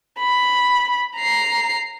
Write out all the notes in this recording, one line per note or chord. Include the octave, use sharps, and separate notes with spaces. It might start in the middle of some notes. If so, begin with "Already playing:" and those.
B5
A#5 C7